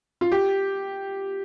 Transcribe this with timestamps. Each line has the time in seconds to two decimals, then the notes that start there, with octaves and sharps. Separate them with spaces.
0.21 F4
0.32 G4